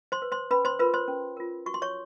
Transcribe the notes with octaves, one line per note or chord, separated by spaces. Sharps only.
C5 C6
B4
C5 C6
C#4 B4 B5
C5 C6
F4 A#4 B4 B5
C5 C6
C#4
F4 A#4
F#4 C#6
C6
C#5 C#6